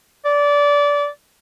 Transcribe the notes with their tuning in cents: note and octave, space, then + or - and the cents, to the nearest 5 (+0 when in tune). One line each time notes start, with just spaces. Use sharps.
D5 -20